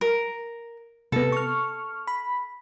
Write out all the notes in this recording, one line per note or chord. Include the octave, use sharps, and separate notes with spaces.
A#4
C3 B3 A4
C#6 F6
B5